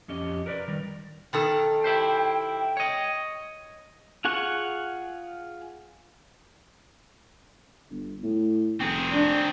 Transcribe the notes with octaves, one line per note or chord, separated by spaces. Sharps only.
F2 C#4 G4 D#5
A#4 B4 D5
D#3 G3 A#4
B2 D#3 A4 G5
E4 G4 C5
C#5 D#5
F4 G#4 F#5 C#6
G1
A2
F1 C4 G#4
D4